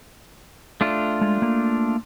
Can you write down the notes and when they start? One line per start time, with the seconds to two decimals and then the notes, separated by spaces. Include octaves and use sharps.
0.81 A3 D4 F4
1.21 G#3
1.42 A#3